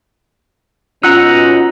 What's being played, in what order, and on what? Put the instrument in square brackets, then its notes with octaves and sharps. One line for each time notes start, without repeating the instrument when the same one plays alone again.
[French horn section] B2 C#4 [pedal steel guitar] D#4 F#5 A#5 [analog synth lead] F4 [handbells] E6 F#6